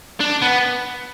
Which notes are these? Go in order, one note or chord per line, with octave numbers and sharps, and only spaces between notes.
D4
B3